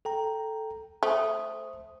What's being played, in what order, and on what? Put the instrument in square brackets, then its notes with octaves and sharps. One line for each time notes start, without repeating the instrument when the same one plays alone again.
[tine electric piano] A4 G5 A#5
[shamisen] A3 [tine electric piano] C5 D#6